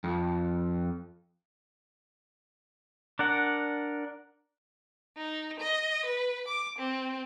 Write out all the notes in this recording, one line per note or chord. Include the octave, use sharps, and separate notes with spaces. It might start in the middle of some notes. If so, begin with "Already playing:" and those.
F2
D4 A#4 F#5
D#4
D#5
B4
D6
C4